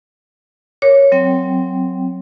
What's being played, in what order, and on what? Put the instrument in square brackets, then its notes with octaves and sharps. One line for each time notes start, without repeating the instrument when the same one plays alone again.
[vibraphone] A#4 [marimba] C#5
[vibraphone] F#3 C4 G5